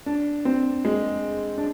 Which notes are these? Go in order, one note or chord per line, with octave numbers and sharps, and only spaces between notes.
D4
C4
G#3
D4